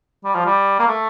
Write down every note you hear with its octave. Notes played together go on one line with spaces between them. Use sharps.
G3
F3
G3
A#3
A3